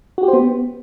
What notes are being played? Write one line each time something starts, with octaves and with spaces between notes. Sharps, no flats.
F#4
G4
C5
B3